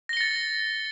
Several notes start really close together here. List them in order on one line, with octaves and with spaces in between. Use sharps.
A#6 G7 C#7 A6